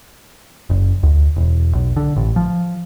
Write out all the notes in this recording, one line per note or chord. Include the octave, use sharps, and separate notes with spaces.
F#1
D2
E1
B1
D3
A1
F3